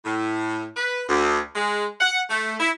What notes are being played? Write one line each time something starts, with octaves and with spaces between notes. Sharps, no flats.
A2
B4
D2
G#3
F#5
A3
E4